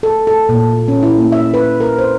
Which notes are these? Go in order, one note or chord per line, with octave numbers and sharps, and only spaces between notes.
A4
A4
A#2
C#4
E4
A#3
E5
B4
A#4
C5